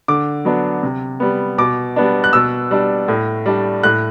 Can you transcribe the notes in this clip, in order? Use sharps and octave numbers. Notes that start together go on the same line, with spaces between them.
D3 D6
F#3 B3 D4
C3
G3 B3
B2 D6
G3 B3 D4
F#6
B2 E6
G3 D4
A2
G3 D4
A2 F#6